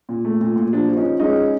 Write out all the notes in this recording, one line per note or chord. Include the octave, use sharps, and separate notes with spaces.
A#2
A3
A#2
A#2
F3 D4
F3
C#4 D#4
F3
G#3 C#4 D#4
G#3